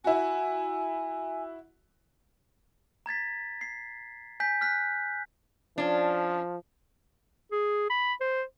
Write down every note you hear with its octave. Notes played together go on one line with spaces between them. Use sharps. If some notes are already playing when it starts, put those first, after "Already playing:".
E4 F#4 G#5
A#5 G#6 A6 B6
C7
G#5 G6 B6
F6 F#6 B6
F3 C#4 D4
G#4
B5
C5